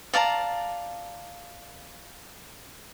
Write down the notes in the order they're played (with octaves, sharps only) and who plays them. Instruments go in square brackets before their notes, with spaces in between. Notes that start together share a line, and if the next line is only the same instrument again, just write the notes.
[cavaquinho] D5 F5 A5 A#5